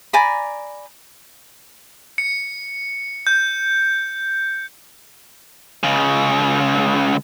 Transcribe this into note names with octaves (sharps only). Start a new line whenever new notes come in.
D5 G#5 A#5 B5
C#7
G6
C#2 C#3